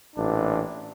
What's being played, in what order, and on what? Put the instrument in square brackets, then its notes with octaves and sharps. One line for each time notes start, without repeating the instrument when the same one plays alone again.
[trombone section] A1 A#2 D4